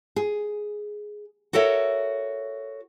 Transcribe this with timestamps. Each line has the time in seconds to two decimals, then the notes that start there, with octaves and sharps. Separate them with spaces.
0.16 G#4
1.53 F#4 A4 A#4 C#5 E5